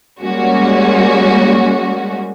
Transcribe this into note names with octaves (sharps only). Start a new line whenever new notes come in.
G3 G#3 A#3 C#4 F#4